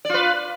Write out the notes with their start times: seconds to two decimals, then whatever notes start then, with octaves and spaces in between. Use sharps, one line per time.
0.05 D5
0.09 F4
0.14 B4